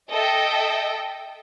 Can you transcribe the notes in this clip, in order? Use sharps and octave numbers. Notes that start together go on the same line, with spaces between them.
A4 D#5 E5 G5